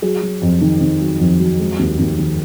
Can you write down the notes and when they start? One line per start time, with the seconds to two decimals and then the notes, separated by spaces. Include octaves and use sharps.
0.02 F#3 G#4
0.22 F#3
0.42 F2
0.61 D#3
0.81 D#3
1.01 F#3
1.20 F2
1.40 F#3
1.60 G#3
1.79 D#2
1.99 D#2
2.18 D#3